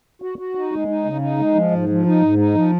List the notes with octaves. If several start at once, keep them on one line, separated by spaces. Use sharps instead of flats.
F#4
F#4
D#4
G#3
D#4
C#3
D#4
G#3
F3
G#2
F3
D#4
G#2
D#4
F3